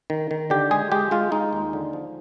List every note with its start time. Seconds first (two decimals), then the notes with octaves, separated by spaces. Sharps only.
0.10 D#3
0.31 D#3
0.50 D3 G4
0.71 G#3 G#4
0.92 G#3 G4
1.11 G#3 F4
1.32 G#3 D#4
1.53 D#2
1.73 D3
1.93 F3